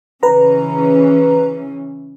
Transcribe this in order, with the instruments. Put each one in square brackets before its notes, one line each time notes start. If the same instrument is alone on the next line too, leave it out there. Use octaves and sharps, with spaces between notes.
[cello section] C#3 E3 C#4 [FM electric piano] B4 A#5